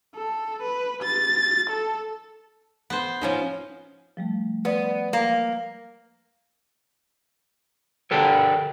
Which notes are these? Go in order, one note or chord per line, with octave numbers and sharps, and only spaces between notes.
A4
B4
A6
A4
B3 C5
F3 C#4 D#4
F3 G3 A3
B3 B4 D5 D#6
A#3
D3 D4 G4 A4 A#4